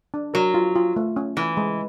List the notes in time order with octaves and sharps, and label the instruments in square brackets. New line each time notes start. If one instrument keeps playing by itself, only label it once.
[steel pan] D4
[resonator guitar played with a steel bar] F#3 [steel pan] A#4
[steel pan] F4
F4
A3
C#4
[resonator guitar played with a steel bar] E3 [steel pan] E4
[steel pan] G#3